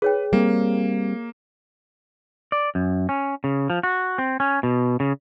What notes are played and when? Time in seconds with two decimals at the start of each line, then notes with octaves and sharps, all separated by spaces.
0.02 G#4 B4 C#5 G5
0.33 G3 A#3 C4
2.52 D5
2.75 F#2
3.09 C#4
3.44 C#3
3.70 F3
3.83 F#4
4.18 C4
4.40 C#4
4.63 B2
5.00 C#3